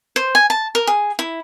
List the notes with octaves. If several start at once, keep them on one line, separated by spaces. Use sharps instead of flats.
C5
G#5
A5
A#4
G#4
E4